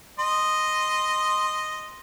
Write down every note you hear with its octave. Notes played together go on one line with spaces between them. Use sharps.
D#5 C6